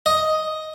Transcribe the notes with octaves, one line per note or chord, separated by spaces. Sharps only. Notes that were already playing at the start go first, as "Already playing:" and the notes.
D#5